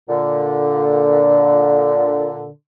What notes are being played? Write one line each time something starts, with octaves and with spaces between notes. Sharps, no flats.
A#2 D3